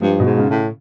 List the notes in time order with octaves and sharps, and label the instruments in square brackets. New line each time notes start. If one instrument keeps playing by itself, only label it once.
[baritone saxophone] G2 [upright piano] F3
[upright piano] B2
[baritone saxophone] G#2
[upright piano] C#3
[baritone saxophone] A2